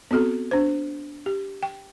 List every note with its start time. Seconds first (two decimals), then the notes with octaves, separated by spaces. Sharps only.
0.11 B3 C4 F#4 A4
0.51 D4 C5
1.26 G4
1.63 G5